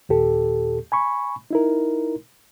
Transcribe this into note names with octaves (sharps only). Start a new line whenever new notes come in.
D#2 A#2 G4 A4
G#5 B5 C#6
D#4 E4 A#4